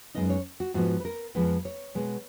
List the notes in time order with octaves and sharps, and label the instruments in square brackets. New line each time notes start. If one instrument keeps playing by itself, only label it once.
[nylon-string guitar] F#2 D#3 G#3 B3 D#4 D#5
C#5
F#4
G#2 F3 B3 D#4 F#4
B4
A#4
F2 F3 G#3 B3 B4
C#5
B2 G#3 B3